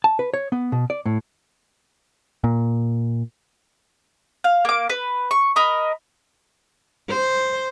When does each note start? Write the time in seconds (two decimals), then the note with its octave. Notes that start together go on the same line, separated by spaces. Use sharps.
0.04 A5
0.19 B4
0.34 C#5
0.52 B3
0.72 B2
0.90 D5
1.06 A2
2.44 A#2
4.44 F5
4.65 A#3 D6
4.89 B4
5.31 C#6
5.56 A#4 D#5 B5
7.09 C5